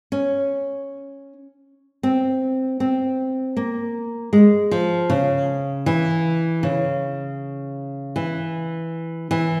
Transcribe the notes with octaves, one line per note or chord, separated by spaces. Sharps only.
C#4
C4
C4
A#3
G#3
F3
C#3
E3
C#3
E3
E3